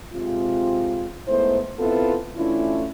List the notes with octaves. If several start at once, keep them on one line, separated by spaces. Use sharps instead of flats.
C3 G#3 C4 F4
G#2 A3 B3 E4 C5
B3 C4 E4 F4 A4 B4
E3 A3 C#4 D4 E4 F4